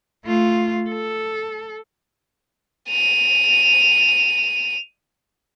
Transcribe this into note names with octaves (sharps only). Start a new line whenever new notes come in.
A3 F4
A4
D#7 F7